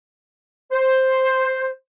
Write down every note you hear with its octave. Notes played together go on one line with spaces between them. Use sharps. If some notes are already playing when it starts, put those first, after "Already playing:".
C5